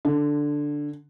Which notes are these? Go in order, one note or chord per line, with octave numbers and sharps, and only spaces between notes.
D3